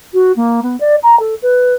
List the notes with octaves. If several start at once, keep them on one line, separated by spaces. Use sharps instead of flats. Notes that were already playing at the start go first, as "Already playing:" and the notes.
F#4
A#3
B3
D5
A#5
A4
B4